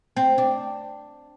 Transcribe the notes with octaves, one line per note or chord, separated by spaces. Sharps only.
C4
D4